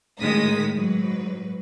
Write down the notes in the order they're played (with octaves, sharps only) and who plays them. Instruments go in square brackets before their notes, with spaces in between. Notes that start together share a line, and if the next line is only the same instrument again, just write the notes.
[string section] A2 D#3 G#3 D#6 B6
G#2 F#3 B4